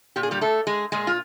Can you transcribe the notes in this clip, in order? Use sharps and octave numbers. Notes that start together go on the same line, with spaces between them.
A#2 G4
G#4
G3 G4
A3 A4
G#3 G#4
A#2 G#3 G#4
F4